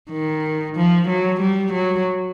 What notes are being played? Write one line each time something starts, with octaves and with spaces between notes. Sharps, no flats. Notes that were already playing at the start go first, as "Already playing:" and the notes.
D#3
F3
F#3
G3
F#3